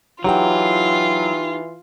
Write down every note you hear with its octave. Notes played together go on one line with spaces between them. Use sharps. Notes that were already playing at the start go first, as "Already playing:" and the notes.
E3 F#3 D#4 F4 G4 G5